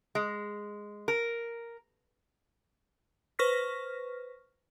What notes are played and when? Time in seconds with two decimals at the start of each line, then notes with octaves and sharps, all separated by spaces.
0.15 G#3
1.08 A#4
3.39 B4 C5 C#6 F6 A#6 B6